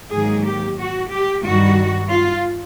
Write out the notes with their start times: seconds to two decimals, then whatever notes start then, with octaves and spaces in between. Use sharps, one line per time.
0.13 G#2 D#3 F#3 A#3 G#4
0.46 G4
0.78 F#4
1.11 G4
1.44 G2 D#3 G3 F#4
2.10 F4